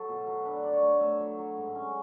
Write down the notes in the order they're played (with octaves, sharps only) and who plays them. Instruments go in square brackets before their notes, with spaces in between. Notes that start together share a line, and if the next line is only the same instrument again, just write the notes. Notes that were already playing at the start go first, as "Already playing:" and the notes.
Already playing: [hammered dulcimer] F#3 A4
B2
F#3
D4 B4
D4 D5
C#5
A3
A3 E5
F#3
F#3
G#2
C#4